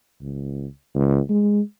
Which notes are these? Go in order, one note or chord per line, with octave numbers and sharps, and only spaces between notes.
C#2
C#2
G#3